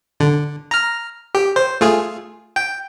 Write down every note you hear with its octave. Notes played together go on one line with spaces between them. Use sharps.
D3
A#5 F6
G4
C5
A3 F4 G#4
G5